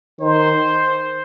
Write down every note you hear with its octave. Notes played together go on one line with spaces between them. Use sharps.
D#3 C5